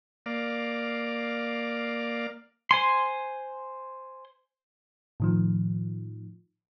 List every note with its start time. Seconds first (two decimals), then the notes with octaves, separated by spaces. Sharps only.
0.26 A#3 D5 F5
2.71 C5 G#5 C6
5.20 A2 D#3 F3